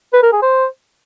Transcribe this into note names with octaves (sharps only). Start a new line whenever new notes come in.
B4
A#4
G#4
C5